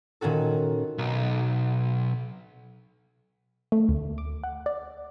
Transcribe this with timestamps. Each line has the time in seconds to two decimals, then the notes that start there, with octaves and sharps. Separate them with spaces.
0.21 A#2 D#3 C#4 F#4 A4
0.98 B1
3.72 A3
3.89 D2
4.18 D6
4.44 F#5
4.66 D5